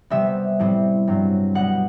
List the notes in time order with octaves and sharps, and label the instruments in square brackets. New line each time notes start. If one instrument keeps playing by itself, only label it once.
[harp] C3 G3 B3 E5
A2 G3 C4
G2 F#3 C4
B2 G3 B3 F#5